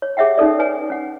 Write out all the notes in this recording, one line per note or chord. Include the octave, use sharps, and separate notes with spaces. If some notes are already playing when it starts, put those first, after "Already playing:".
C#5
G4 G#4 C#5 E5 F#5 G5
C#4 D#4 A4 D5
B4 C#5 G#5
C#4 F#5